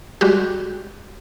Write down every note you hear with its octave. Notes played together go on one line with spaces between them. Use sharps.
G3 G#3 F#4 G4